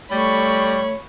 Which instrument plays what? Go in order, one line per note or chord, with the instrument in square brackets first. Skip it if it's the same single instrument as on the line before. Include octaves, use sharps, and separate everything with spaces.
[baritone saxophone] G3 [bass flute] A3 [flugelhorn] C#5 [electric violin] B5 C#6